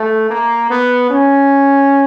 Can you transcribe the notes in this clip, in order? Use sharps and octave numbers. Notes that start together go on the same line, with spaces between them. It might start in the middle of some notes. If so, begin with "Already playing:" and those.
Already playing: A3
A#3
B3
C#4